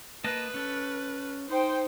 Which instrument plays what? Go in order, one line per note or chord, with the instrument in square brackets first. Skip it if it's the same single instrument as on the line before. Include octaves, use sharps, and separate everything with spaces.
[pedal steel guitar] A#3 D#5 A5 [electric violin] B4
[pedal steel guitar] C#4 A4
[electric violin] D#4 [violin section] C5 G5